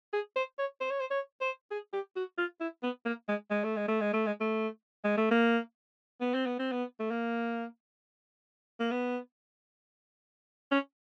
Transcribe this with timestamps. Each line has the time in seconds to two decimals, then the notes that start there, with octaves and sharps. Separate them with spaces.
0.13 G#4
0.36 C5
0.58 C#5
0.81 C5
0.90 C#5
1.00 C5
1.11 C#5
1.41 C5
1.71 G#4
1.93 G4
2.16 F#4
2.38 F4
2.61 E4
2.83 B3
3.05 A#3
3.28 G#3
3.51 G#3
3.64 A3
3.76 G#3
3.88 A3
4.01 G#3
4.14 A3
4.26 G#3
4.41 A3
5.05 G#3
5.18 A3
5.31 A#3
6.21 B3
6.34 C4
6.46 B3
6.59 C4
6.72 B3
7.00 A3
7.11 A#3
8.80 A#3
8.91 B3
10.71 C#4